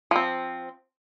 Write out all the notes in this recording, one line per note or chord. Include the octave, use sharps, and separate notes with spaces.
F3 C4